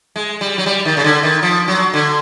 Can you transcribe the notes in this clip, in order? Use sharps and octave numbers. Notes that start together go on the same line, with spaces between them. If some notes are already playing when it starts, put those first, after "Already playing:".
G#3
G3
F#3
G3
D#3
C#3
D3
D#3
F3
F#3
D3